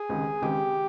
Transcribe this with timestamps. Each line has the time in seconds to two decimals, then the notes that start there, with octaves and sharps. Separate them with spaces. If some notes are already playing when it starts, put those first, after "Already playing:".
Already playing: G#4
0.09 C#2 C3 D#3
0.42 C#2 C3 D#3 G4